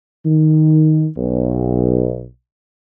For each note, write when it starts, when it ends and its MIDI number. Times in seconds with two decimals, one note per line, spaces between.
0.24 1.05 51
1.17 2.24 35